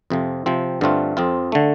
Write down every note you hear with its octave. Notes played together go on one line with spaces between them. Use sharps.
F2 C3 F3
C3 F3 C4
G2 D3 A3 C4 F4
F2 F3 C4 F4
D3 A3